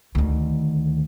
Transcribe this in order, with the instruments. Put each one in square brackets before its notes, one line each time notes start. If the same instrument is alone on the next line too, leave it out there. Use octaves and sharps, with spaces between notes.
[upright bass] D2 D#3